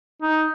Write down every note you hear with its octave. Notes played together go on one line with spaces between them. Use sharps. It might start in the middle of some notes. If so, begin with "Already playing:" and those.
D#4